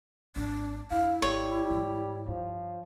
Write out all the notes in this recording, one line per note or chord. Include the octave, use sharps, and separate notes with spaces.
G#1 D4
F2 E4 F5
G#1 G3 C#5
G#2 E3
G2 F3